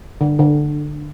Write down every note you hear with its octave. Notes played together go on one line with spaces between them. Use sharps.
D3
D3